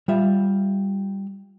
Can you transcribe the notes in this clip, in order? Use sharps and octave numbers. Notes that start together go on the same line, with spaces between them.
G3 F4 E5